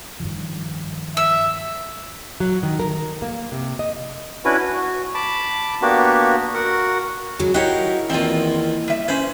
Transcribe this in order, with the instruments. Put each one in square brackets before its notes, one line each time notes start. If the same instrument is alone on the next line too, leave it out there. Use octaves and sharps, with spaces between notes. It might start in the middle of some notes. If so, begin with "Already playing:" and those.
[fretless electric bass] G2 D#3 F3
[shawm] E5 [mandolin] E6
[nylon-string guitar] F#3
D#3
A#4
A#3
C3
D#5
[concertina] C#4 D4 E4 F#4 B4
F#4
A5 B5 D6
A#3 B3 D4 F#4 G4
F#4 A#4 F#5
[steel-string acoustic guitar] C#3 F#3 G#3
[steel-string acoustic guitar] E4 A#4 [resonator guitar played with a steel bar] F#4 G4 C#5 [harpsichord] D#5 F5
[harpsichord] E2 D#3 A#3 [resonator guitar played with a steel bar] C4 F4
[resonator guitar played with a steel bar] G3 E5
[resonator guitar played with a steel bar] C#4 C5 [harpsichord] B4